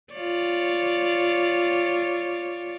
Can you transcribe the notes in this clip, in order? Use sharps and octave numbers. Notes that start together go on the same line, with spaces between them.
F4 C#5 D5